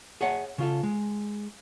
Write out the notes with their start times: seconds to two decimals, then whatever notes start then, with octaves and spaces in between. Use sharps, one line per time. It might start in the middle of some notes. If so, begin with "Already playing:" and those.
0.21 G#4 C#5 E5 F#5
0.58 C#3 F4 A4
0.83 G#3